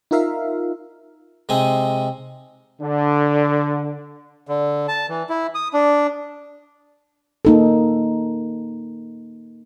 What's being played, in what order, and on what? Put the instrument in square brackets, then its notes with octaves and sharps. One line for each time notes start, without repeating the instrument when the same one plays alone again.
[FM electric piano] D#4 F4 A#4 E5 F5
[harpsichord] C3 G#3 C4 D#4 G#5 D#6
[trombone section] D3
[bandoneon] D3
A5
E3
E4
D#6
D4
[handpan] A#3 D#4 A4